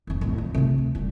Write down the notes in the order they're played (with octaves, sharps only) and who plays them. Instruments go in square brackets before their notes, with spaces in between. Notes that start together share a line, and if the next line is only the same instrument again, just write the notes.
[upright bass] F1 F2
D1 A1
F3
A2 C3
D2
D#1 G3